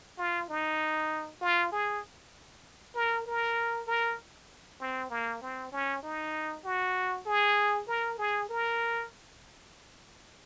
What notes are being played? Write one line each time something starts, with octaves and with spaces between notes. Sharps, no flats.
F4
D#4
F4
G#4
A#4
A#4
A#4
C4
A#3
C4
C#4
D#4
F#4
G#4
A#4
G#4
A#4